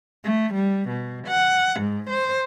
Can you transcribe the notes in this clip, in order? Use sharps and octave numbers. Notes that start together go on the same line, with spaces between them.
A3
G3
B2
F#5
G#2
C5